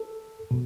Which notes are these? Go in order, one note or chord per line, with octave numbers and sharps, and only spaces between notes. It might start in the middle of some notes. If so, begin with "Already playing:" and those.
Already playing: A4
B2